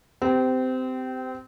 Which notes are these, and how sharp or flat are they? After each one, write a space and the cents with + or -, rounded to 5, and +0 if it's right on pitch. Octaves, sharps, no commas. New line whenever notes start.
C4 -25 G4 +0